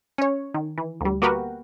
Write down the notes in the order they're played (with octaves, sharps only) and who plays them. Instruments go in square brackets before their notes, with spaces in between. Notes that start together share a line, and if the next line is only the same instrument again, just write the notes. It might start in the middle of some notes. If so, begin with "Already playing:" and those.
[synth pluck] C#4 C#5
D#3
E3
D2 G3
A#3 B3 F#4 G4 A#4 B4